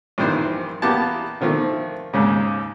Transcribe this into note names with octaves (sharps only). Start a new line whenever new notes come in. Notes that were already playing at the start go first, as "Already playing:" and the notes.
A#1 G2 D#3 E3 C5
E2 A#3 B3 G4 A5
D3 D#3 F3 A3
D#2 G#2 C#3